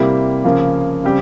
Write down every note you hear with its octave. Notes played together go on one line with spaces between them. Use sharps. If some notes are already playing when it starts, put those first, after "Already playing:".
Already playing: C3 G3 A#3 E4 G4
C#3 F3 A#3
C#3 G3 C4 G4